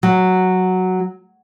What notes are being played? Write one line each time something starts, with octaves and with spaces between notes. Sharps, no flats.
F#3